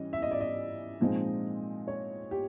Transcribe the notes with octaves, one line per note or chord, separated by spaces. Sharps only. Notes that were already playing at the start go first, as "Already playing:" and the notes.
Already playing: E3 G3 C#4 D#5
E5
D#5
D5
D#5
A#2 F3 G#3 C4 D#4
C#5
G4